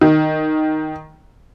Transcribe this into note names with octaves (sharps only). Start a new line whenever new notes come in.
D#3